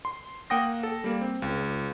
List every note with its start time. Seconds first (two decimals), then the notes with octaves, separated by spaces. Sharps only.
0.05 C6
0.50 A#3 F#5 G5 D#6 A#6
0.83 A4
1.04 G3 A#3
1.21 C4
1.42 C#2